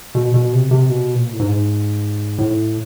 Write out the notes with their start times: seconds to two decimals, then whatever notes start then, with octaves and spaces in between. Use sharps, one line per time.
0.15 B2
0.34 B2
0.52 C3
0.71 C3
0.89 B2
1.14 A#2
1.33 A2
1.39 G#2
2.38 A2